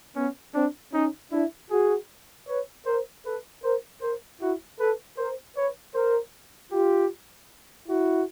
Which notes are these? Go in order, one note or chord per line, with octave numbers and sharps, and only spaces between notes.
B3 C#4
C4 D4
C#4 D#4
D4 E4
F#4 G#4
B4 C#5
A#4 C5
A4 B4
A#4 C5
A#4 C5
E4 F#4
A4 B4
A#4 C5
B4 C#5
A#4 C5
F4 G4
E4 F#4